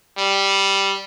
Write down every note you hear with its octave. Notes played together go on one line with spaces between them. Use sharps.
G3